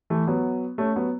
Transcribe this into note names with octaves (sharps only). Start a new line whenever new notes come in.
E3 A3
F#3 B3
A3 C#4
F#3 B3